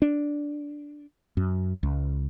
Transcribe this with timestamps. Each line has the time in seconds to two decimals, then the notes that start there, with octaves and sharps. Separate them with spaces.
0.02 D4
1.37 F#2
1.83 C#2